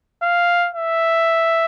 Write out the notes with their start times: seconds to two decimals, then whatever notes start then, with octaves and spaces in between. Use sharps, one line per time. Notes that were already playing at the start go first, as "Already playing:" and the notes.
0.22 F5
0.74 E5